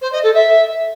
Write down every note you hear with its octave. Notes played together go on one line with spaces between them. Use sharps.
C5
D#5
A4
E5